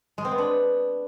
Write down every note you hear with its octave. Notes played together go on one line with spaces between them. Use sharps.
G#3
C4
B3
D4